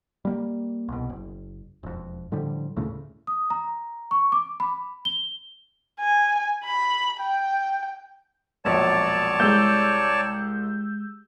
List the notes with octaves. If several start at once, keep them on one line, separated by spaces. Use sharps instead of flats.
G3 A#3
C2 B2
F#1
E1 F2
A2 D3 F3 G3
D2 A2 C#3 A3
D#6
A#5
C#6
D6
B5
G7
G#5
B5
G5
E1 A#1 F#3 C#5 D5 A5
C2 G#3 E6 G6